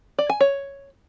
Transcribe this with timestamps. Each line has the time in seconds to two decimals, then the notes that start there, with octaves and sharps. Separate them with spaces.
0.19 D5
0.30 G#5
0.41 C#5